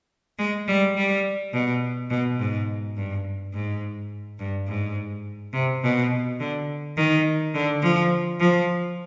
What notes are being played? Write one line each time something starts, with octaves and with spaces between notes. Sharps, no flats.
G#3
G3
G3
B2
B2
G#2
G2
G#2
G2
G#2
C3
B2
D3
D#3
D3
F3
F3